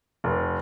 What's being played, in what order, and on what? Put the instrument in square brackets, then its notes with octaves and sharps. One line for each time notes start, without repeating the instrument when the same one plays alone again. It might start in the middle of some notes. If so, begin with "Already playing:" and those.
[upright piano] F1